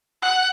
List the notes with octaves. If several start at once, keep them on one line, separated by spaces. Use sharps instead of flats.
F#5